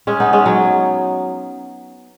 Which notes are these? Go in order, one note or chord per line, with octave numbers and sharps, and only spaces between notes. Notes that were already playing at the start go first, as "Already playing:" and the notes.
G#3 C#4
B3 D#4
G#3 C#4
F#3